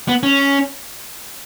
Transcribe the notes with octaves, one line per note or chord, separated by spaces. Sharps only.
B3
C#4